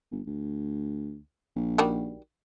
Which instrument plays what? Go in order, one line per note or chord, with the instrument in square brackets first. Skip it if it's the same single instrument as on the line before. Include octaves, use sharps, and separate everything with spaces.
[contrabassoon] G1
D2
A#1
[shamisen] D#3 G3 F#4